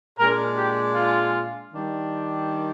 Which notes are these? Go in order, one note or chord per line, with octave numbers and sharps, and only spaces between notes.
A#2 G#3 D4 A#4
G4
F4
D#3 G3 D4